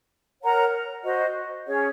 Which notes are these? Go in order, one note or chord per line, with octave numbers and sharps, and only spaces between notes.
A#4 C#5 F#5 A#5
F#4 C5 D#5
C#4 G#4 C#5